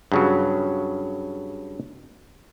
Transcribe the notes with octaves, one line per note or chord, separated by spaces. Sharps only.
G2 C#3 F#3